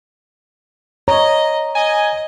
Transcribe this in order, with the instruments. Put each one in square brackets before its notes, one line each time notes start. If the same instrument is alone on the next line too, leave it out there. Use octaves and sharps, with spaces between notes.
[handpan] C#5 [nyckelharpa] D#5 [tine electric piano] A#5
[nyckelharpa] D#5 [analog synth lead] G#5